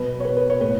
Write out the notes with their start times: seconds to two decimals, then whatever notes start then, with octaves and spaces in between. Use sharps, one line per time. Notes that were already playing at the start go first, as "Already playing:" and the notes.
Already playing: B2 F#3 B4
0.20 C#5
0.25 B4
0.37 B4
0.50 C#5
0.61 A2 B4